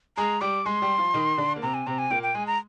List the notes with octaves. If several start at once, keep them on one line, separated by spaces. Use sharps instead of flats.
G#3 G#4 A#5
G3 G4 D6
G#3 G#4 C6
G3 G4
F3 F4
D#3 D#4
D3 D4
A#3
C3 C4 A#5
G#5
C3 C4 A#5
G#5
A#2 A#3 G5
G5
G#3 G#5
A#5